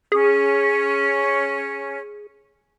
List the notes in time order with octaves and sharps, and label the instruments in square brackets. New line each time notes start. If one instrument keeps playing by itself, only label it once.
[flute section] C#4 [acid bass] G#4